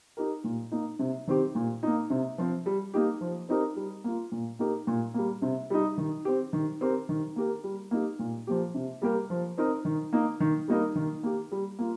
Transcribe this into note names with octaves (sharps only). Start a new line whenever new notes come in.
D#4 G4 A#4
A#2
A#3 D#4
C3
D#3 C4 G4
A#2
A#3 D#4
C3
F3 C4
G3
A#3 D#4 G4
F3
C4 D#4 G4 A#4
G3
A#3 F4
A#2
A#3 D#4 G4 A#4
A#2
G3 A#3
C3
G3 D#4
D#3
C4 G4
D#3
C4 G4 A#4
D#3
A#3 G4 A#4
G3
A#3 D#4 G4
A#2
F3 A#3 G4
C3
G3 A#3 G4 A#4
F3
C4 D#4 A#4
D#3
A#3 D#4
D#3
G3 A#3 D#4 A#4
D#3
A#3 G4
G3
A#3 F4